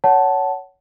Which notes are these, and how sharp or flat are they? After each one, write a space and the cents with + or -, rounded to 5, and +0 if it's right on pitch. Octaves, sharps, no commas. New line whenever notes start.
C#5 +10 F#5 +15 A5 -5